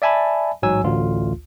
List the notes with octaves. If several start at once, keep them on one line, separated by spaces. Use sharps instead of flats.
D5 E5 G#5 A5 B5
A1 G#2 F#3 G#5 E6
A1 D2 F4